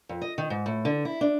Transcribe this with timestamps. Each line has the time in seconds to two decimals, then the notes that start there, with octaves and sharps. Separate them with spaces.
0.09 F2
0.22 D#5
0.38 D#3
0.50 G#2
0.66 A2
0.85 D3
1.05 E4
1.21 D4